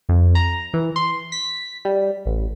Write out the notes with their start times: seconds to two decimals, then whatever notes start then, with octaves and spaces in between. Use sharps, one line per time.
0.09 F2
0.35 A#5
0.74 E3
0.96 C6
1.32 B6
1.85 G3
2.25 A1